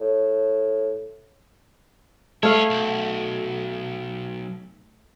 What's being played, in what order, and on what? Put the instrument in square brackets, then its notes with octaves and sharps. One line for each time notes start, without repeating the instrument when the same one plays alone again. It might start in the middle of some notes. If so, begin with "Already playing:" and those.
[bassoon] A2
[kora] A3 F5 [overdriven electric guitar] B3 C#5
[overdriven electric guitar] B1